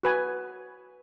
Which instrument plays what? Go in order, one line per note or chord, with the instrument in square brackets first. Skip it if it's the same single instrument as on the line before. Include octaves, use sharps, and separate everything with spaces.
[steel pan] F#4 B4 G#5